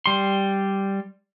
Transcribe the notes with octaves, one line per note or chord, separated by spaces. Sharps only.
G3 C6